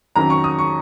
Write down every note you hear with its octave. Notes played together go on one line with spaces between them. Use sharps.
F2 D#3 F#3 C#4 A#5
C#6
D#6
C#6